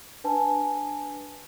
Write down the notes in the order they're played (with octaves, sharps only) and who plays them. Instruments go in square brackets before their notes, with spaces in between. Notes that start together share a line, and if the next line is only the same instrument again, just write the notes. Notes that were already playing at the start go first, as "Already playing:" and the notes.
[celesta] D4 B4 G#5 A5